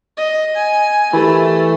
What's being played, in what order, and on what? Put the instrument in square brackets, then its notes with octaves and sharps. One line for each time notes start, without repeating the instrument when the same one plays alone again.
[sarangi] D#5
G#5
[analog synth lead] E3 [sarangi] A3 [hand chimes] G4 A#4 B5